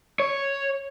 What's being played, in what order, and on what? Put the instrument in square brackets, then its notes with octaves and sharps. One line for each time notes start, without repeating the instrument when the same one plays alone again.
[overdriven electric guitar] C#5